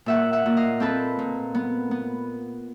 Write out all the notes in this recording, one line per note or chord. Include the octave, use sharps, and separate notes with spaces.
A#2 E5 F#5
E5 F#5
A#2
D#5 F5
C4 A4 B4
A#2
B3
B3